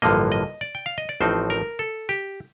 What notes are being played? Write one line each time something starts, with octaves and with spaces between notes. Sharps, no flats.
A1 G2 D3 F3 A#3 D#5
D#5
D5
G5
F5
D#5
D5
A1 A2 F3 C4 D#4 C5
A#4
A4
G4